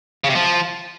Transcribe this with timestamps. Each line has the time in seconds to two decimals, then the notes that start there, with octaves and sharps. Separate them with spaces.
0.24 C#3
0.30 C3
0.35 F3